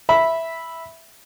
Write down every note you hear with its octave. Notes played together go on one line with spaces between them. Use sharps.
E5 B5